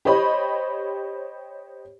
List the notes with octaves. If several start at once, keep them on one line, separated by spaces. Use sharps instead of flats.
G4 C5 C#5 D#5 B5